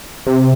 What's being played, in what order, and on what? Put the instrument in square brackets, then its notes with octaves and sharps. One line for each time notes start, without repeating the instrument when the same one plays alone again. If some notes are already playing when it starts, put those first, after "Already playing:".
[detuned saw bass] C3